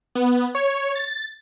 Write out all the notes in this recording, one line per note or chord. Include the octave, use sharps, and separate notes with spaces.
B3
C#5
A6